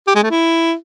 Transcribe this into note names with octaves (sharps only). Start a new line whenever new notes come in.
G4
G#3
A3
E4